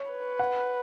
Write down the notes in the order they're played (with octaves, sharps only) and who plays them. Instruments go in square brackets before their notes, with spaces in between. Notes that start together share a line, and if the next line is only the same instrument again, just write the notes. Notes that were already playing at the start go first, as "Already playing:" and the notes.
Already playing: [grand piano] C#5
[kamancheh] B4
[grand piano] F#5